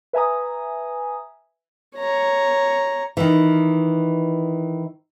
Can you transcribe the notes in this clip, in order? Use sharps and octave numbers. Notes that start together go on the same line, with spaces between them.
B4 E5 G#5 A#5 D#6
C#5 A#5
D#3 E3